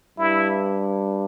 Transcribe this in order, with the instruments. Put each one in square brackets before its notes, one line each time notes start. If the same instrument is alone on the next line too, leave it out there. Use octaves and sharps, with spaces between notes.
[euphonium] G2 [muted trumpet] E4